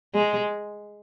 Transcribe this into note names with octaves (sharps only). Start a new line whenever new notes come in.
G#3